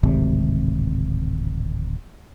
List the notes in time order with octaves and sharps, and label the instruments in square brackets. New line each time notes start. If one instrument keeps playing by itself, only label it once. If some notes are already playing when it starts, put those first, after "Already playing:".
[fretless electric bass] D1 G#1 C3